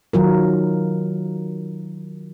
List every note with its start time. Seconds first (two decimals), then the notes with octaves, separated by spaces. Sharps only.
0.13 D#3 F#3 F4 A#4